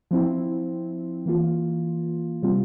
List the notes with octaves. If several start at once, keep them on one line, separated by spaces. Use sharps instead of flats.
F3 C4 E4
E3 A#3 F4
C3 G3 C4 F4